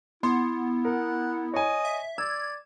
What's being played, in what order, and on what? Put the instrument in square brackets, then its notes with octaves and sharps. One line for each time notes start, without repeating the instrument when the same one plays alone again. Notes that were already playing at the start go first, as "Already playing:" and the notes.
[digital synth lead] B3 [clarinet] E4 [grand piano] C6
[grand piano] A#4 [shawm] F#5
[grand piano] C#5 G#5 [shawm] D#5
[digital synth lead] E5
[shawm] D5 [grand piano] E6 [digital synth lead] G#6